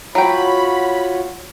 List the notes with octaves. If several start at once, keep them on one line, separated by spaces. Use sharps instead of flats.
F#3 F4 F#4 C#5 G5 B5